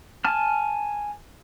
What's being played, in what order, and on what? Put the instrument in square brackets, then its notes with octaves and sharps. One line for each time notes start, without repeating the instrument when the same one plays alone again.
[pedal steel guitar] G#5 A5 F6